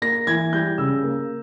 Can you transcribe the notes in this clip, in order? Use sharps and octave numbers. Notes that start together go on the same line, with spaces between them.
A#3 A#6
E3 G#6
G3 G6
C#3 E6
A#3